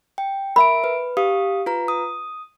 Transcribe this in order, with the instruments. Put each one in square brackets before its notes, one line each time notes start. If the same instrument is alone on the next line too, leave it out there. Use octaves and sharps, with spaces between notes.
[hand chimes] G5
[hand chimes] A#4 E5 D7 [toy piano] B5
[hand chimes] B4
G4 F5 D#6
F4 B4 A#5
D#6